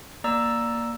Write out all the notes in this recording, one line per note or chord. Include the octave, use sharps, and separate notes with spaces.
A#3 D5 A#5 E6